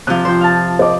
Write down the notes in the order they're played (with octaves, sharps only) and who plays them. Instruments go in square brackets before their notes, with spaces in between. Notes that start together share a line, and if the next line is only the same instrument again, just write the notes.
[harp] C3 F3 [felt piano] F#6
[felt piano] F3 [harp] C5 G5
[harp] F5 A5
[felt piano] C5 D#5 D6